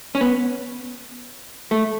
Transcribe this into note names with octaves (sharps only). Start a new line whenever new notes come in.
C#4
B3
A3